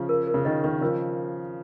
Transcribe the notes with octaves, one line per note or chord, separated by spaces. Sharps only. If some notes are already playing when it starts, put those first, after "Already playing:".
Already playing: C#3 F3
A#4
A#4
C#3
D#3 D#5
D#3 C#6
C#3 F3 A#4